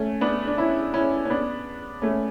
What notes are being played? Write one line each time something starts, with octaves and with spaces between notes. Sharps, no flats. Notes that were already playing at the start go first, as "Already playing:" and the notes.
Already playing: A3 C#4
B3 D4
D4
C#4 E4
C#4 E4
C#4
B3 D4
A3 C#4